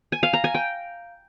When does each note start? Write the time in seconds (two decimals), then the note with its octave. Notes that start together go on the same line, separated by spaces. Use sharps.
0.12 G#5
0.23 F5
0.33 A#5
0.44 G#5
0.55 G5